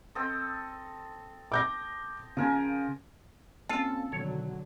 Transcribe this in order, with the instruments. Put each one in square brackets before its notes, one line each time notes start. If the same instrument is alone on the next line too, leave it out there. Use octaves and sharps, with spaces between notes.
[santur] C4 A4 D#5
[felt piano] D6 G6 A#6
[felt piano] C#3 [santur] F3 A#4 G#5
[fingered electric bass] A#3 C4 C#4 [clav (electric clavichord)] F4 [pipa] A4
[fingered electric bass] B2 D#3 B3 [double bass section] D3 F#3 [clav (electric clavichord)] C#5